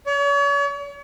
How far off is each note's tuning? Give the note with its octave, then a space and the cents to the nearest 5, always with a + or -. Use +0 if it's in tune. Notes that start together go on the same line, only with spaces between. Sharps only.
C#5 +40